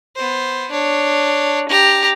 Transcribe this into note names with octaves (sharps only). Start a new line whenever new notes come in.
B3 C5
D4 C#5
G4 A#5